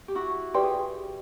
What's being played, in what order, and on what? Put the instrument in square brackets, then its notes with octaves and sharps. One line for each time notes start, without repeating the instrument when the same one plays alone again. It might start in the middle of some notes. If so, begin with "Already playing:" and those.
[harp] G4
E4 F#4
[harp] G4 [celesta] B4 D5 G5 C6
[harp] G#4